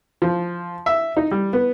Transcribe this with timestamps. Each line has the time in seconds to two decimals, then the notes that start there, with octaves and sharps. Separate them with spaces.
0.22 F3
0.86 E5
1.17 D#4
1.31 G3
1.53 B3